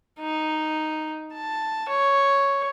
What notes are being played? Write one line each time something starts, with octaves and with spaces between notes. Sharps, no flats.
D#4
A5
C#5